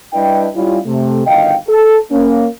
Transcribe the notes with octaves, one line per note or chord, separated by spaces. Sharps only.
G3 D4 E4 B4 D#5 G5
G3 C#4 E4 F4
C3 A3
G1 D2 D#3 D#5 F5 G5
A4
A#3 C#4